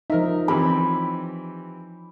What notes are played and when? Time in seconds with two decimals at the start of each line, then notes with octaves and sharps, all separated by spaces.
0.10 F3 D#4 A#4 E5
0.48 E3 C4 G4 B5